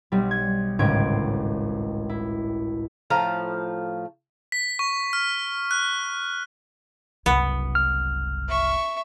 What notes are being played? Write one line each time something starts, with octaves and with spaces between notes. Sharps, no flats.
B1 G3
G#6
G#1 C#2 A2 C#4 G#6 D7
E4
A2 F3 F5 A#5
B6
C#6
F6
F#6
F#1 C2 B3
F6
E5 C#6